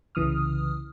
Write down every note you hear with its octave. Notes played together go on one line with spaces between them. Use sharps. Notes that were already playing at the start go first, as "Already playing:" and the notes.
C2 C#3 E3 D#6 F6